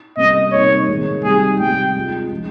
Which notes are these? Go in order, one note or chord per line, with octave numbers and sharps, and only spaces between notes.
C3 G3 A#3 C#4 D#5
C3 G3 A#3 D#4 C#5
C3 D#3 G#3 C4
G3 C4 D#4 G4 G#4
C3 G3 C4 G4 G5
G#3 C4 F4
F3 G#3 C#4 F4